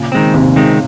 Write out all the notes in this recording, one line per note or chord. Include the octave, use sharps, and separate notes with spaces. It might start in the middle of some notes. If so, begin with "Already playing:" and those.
Already playing: A#2 C#3
D#3 G#3 C4
D#2 G#2 C3
D#3 G#3 C4